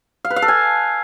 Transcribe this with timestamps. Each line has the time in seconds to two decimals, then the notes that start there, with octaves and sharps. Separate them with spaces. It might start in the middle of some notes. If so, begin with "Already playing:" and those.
0.25 F5
0.30 B4
0.36 F5
0.42 A4
0.48 G#5